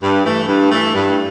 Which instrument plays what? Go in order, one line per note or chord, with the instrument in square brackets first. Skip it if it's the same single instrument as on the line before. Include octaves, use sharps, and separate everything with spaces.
[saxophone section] G2
E3 A3
G2
E3 A3
G2